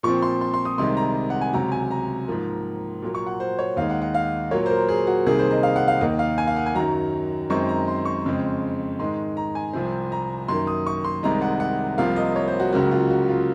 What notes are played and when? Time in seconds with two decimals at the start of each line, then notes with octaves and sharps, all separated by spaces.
0.03 A#2 F3 C4 C#6
0.22 C6
0.41 C6
0.54 C6
0.65 D#6
0.78 C2 C3 D#3 G#3 C6
0.97 A#5
1.30 F#5
1.41 G#5
1.53 C#2 C3 F#3 A#5
1.72 G#5
1.91 A#5
2.28 G#2 F3 A#3
3.02 A#2 F#3 A#3
3.15 C#6
3.26 F#5
3.40 C5
3.59 C#5
3.77 D#2 D#3 G#3 F5
3.90 F#5
4.02 F#5
4.14 F5
4.51 A#2 F#3 A#3 C#5
4.66 C5
4.70 A#4
4.89 G#4
5.07 F#4
5.26 C2 C3 D#3 A#3 G#4
5.39 C5
5.51 D#5
5.63 F5
5.76 F#5
5.88 F5
6.01 D#2 D#3 A#3 D#5
6.19 F5
6.38 G#5
6.47 F5
6.56 F#5
6.66 G#5
6.75 F#2 D#3 F#3 A#5
7.50 F#2 D#3 G#3 C4 C#6
7.69 A#5
7.88 C6
8.05 C#6
8.25 F2 C#3 G#3 C4
8.99 G#2 D#3 G#3 C6
9.37 A#5
9.55 G#5
9.73 C2 C3 F3 C4
10.12 A#5
10.48 F#2 D#3 A#3 C6
10.67 D#6
10.87 C#6
11.04 C6
11.23 C2 C3 D#3 G#3 A#5
11.42 F#5
11.60 F#5
11.98 C2 C3 F3 A#3 F5
12.16 D#5
12.36 C#5
12.48 C5
12.60 F#4
12.73 C#2 C#3 F#3 A#3 F#4
12.91 F4
13.10 F#4
13.29 F4